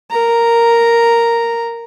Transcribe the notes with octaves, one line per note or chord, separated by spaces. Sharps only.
A#4 A#5